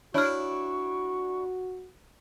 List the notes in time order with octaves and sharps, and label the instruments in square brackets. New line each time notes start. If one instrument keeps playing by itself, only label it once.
[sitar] D4 E4 [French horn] F#4 [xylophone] C#5 F6 [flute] C#6